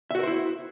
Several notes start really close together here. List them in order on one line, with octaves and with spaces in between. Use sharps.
E5 F#4 A#4 C5 E4